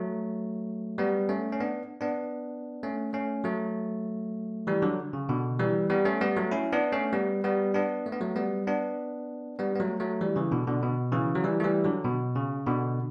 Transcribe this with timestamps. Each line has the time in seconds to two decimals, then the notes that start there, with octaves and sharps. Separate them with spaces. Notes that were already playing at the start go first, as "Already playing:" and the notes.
Already playing: F#3 A3
0.98 G3 B3
1.29 A3 C#4
1.53 C#4
1.60 B3 D4
2.01 B3 D4
2.83 A3 C#4
3.13 A3 C#4
3.44 F#3 A3
4.67 E3 G3
4.82 D3 F#3
5.13 C#3
5.29 B2 D3
5.59 E3 G3
5.90 G3 B3
6.05 A3 C#4
6.21 G3 B3
6.37 F#3 A3
6.51 C#4 E4
6.72 B3 D4
6.92 A3 C#4
7.13 G3 B3
7.44 G3 B3
7.74 B3 D4
8.06 A3
8.12 B3
8.21 F#3 A3
8.36 G3 B3
8.67 B3 D4
9.59 G3 B3
9.75 B3
9.80 F#3 A3
10.00 F#3 A3
10.21 E3 G3
10.36 C#3 E3
10.52 B2 D3
10.67 B2 D3
10.83 B2
11.12 C#3 E3
11.35 F#3
11.44 E3 G3
11.60 A3
11.64 E3 G3
11.84 D3 F#3
12.05 B2
12.36 C#3
12.66 B2 D3